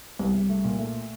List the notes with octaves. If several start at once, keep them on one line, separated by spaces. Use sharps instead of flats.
C2
C2
A3
A#2
A3